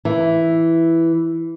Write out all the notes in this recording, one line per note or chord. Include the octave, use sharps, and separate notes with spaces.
E3